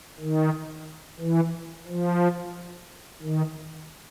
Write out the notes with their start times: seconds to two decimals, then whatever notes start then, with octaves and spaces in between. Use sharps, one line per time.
0.19 D#3
1.20 E3
1.88 F3
3.22 D#3